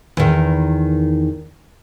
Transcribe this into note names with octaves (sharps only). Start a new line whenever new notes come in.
E2 D#3